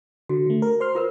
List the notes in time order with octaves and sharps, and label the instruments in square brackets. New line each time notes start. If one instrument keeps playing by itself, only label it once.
[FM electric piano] D3 [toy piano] F#4
[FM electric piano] D3 A3
A#4
C5 C6 F6
[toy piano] F4 A#4 B4